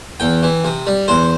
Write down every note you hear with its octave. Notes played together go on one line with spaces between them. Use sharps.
E2 G5
E3
C3
G3
E2 C5